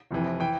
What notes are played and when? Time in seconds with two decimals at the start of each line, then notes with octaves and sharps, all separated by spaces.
0.11 F1 F2 C3 E3
0.40 E3 G5